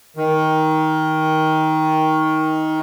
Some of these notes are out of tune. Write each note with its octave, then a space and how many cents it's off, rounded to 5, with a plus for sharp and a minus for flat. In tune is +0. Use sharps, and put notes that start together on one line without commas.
D#3 +15